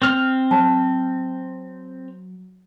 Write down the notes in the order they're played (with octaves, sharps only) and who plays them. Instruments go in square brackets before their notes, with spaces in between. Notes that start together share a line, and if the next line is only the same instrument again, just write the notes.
[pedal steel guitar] C4 F6
[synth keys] F#3 [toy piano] A5